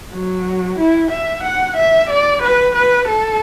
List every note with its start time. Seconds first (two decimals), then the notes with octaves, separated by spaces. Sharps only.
0.13 F#3
0.79 E4
1.11 E5
1.44 F#5
1.77 E5
2.10 D5
2.42 B4
2.75 B4
3.08 A4